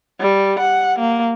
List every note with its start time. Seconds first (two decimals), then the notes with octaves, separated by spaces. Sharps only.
0.21 G3
0.60 F#5
0.99 A#3